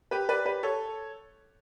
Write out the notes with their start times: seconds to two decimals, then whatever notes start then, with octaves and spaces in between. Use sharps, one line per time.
0.11 G4 B4
0.29 B4 D5
0.45 G4 B4
0.63 A4 C#5